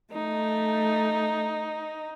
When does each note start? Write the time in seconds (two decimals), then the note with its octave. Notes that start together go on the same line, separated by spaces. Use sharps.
0.13 A3 D#4